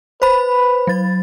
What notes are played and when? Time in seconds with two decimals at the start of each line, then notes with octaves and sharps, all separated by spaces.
0.22 B4 C5 B5
0.87 F#3 A6